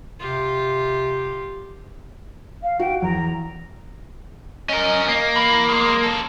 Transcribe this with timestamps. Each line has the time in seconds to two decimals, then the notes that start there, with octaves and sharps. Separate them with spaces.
0.20 C3 F4 G4
2.63 F5
2.79 F#4 G5
3.02 E2 A#5
4.69 C#4 A#4 D#5
5.09 A#3
5.36 E3
5.69 F2 G#3
6.03 C#4 A4